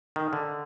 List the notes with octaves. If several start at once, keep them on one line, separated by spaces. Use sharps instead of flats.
D#3
D3